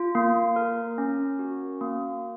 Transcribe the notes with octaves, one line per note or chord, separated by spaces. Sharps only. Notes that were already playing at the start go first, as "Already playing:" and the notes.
Already playing: F4
A#3
A#4
C#4
F#4
A#3